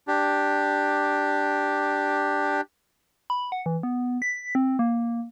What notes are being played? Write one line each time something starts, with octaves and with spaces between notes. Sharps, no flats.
D4 G4
B5
F#5
E3
B3
B6
C4
A#3